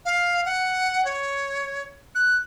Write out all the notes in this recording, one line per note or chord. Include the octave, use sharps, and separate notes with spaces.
F5
F#5
C#5
F#6